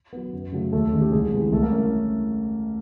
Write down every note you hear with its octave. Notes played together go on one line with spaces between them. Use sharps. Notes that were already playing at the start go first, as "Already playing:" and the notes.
F#3 B3
F#2
C#3 F#3 A3
D#2 A3 A4
D#3 G#3 C#4
G4
C2 G#3 G#4
C3 E3 G#3
C2 A3 A4
A#3 A#4
C#4